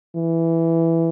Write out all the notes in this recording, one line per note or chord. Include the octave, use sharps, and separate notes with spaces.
E3